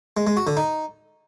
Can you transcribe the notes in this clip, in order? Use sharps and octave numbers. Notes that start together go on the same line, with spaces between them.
G#3
G#3
F#4
D3
D#4